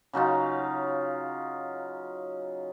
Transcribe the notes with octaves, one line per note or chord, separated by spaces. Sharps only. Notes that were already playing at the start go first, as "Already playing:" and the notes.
C#3 F#3 D#4 F4